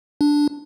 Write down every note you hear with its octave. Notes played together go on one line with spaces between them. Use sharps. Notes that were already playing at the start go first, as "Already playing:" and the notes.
D4